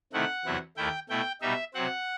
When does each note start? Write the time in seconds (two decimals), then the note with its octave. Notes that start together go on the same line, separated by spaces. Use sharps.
0.13 C3 D#3 A3 E4 F#5
0.45 E2 C3 F#3 B3 E4
0.77 D#2 D#3 A3 E4 G5
1.09 B2 A3 E4 G5
1.41 B2 G3 D#4 E5
1.74 C3 F#3 C4 F#5